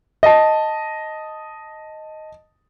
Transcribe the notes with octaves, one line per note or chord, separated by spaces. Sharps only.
D#5 A5